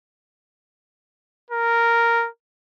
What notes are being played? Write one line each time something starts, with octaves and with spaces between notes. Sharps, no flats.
A#4